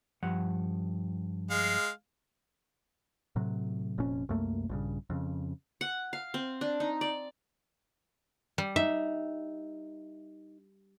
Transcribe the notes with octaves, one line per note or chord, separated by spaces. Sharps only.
G2 F3 F#5
G#3 F5
A2 C3 F#3
F1 F2 A#2 C#4
C2 F#2 A3 A#3
A#1 G2 C#3
F2 C#3
F#5
F5
C4
D4
D#4
D5
G3
D#4 E5